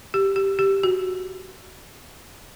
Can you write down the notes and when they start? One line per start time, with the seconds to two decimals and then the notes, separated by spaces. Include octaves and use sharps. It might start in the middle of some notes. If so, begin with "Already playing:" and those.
0.14 G4
0.36 G4
0.59 G4
0.83 F#4